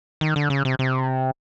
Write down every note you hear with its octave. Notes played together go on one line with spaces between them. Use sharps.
D#3
D3
C#3
C3
C3